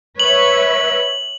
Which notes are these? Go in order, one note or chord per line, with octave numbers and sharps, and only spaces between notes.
B4 C#5 E5 F#7